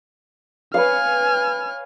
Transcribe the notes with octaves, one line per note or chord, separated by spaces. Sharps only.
B4 C#5 F5 G#5 F6